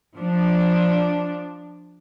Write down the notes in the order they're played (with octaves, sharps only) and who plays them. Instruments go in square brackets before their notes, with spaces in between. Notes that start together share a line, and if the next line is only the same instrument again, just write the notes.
[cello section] F3 D4